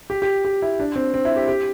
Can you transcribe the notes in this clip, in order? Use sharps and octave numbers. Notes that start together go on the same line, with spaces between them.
G4
G4
G4
E4
D4
C4
C4
E4
G4
G4